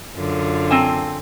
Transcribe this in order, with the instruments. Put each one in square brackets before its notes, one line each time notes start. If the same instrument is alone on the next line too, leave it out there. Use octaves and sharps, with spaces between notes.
[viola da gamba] F#2 D3 F4
[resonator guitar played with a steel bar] C4 G#5 A5